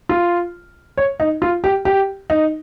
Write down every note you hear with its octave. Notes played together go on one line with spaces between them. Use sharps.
F4
C#5
D#4
F4
G4
G4
D#4